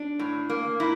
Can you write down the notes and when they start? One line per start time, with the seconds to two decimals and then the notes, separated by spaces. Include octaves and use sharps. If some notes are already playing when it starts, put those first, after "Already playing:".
Already playing: D4
0.19 A2
0.50 A#3
0.80 A#2 E4